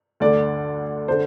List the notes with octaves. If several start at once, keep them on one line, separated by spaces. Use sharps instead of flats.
D2 D3 D5
D3 C5